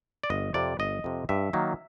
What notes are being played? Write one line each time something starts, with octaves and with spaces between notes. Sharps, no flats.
D5
G1 D#5
F2 C3 D5
G1 D#5
F2 C3
G2 E5
D#3 F#3 A#3